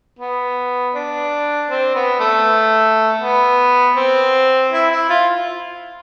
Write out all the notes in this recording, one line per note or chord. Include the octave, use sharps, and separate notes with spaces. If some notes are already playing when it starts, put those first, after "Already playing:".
B3
D4
C4
B3
A3
B3
C4
E4
E4
F4